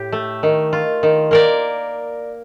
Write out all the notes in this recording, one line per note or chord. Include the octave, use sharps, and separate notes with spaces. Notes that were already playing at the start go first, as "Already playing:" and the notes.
Already playing: A2 G4
A3
D#3
F4
D#3
A#3 A#4 D5